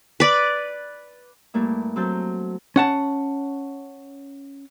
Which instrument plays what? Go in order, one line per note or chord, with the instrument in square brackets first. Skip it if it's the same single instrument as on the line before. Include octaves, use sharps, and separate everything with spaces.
[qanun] B4 D5
[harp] G2 A3 A#3 E4
F#3 C4 A4 G6
[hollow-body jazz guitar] C#4 F#5 A5